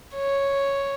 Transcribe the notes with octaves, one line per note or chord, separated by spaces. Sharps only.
C#5